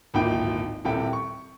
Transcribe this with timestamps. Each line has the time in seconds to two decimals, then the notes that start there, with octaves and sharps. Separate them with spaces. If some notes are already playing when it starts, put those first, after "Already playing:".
0.14 D1 G#1 A#2 D#4 E4 G5
0.85 D#1 A1 C3 E4 A4 G5
1.13 C#6